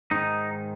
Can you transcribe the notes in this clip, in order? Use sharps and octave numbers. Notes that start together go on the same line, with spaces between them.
G#2 D#3 D#4